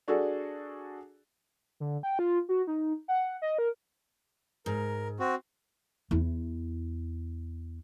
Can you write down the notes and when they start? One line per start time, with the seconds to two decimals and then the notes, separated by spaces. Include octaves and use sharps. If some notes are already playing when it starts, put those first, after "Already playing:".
0.08 D4 F#4 G#4 A4 D5
1.80 D3
2.03 G5
2.19 F4
2.49 F#4
2.67 D#4
3.08 F#5
3.42 D#5
3.58 A#4
4.66 G#2 A#4
5.19 C4 F#4
6.11 E2 E4